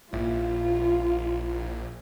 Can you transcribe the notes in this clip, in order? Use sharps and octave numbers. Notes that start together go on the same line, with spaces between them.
A#1 A#2 E4 F4